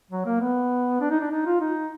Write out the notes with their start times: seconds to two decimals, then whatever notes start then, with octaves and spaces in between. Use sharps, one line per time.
0.11 F#3
0.26 A#3
0.40 B3
1.01 D4
1.10 D#4
1.21 D4
1.31 D#4
1.46 F4
1.61 D#4